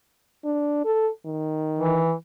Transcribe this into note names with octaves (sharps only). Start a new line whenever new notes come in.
D4
A4
D#3
E3